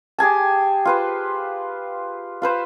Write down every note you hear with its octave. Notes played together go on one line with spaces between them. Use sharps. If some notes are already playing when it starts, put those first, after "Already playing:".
G4 G#4 G#5 A5
F4 B4 C5
F4 B4 C5